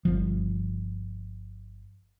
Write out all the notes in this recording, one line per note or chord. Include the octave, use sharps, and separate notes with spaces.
G1 F3